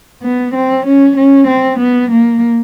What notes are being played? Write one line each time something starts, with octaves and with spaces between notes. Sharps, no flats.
B3
C4
C#4
C#4
C4
B3
A#3